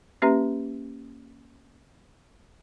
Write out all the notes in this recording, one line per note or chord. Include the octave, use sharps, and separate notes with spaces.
A#3 C#4 G4 B4 E5 A#5